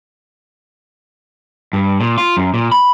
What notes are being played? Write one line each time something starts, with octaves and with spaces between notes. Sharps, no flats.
G2
A#2
F4
F#2
A#2
B5